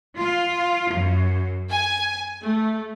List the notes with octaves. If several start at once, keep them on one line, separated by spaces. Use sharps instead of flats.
F4
F#2
G#5
A3